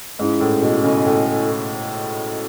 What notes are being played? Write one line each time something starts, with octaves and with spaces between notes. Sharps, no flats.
G#2 C#4 E4 G#4
A2
B2
C#3 E4 A4 D#5 G#5
A2